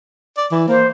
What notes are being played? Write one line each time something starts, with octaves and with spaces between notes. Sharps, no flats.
D5
E3
A#3 C5